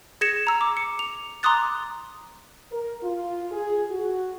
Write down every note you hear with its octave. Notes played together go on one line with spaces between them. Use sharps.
G#4 G#6 A#6 C#7 E7
A#5 E6
D6
C#7
F7
A#5 C6 D6 D#6 F#6 A6
A#4
F4
G#4
F#4